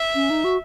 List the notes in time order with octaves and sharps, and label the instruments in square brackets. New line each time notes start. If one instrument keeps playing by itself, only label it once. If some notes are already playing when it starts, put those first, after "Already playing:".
Already playing: [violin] E5
[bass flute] C#4
D#4
F#4